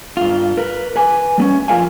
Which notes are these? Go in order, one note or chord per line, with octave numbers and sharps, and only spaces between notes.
G2 F4
A#4 B4
B4 G#5
G3 B3 C#4
F2 F4 A#4 F5 G#5